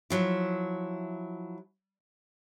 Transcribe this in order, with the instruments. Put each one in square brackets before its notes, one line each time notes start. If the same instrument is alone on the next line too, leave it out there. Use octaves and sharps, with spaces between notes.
[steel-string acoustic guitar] F3 F#3 E4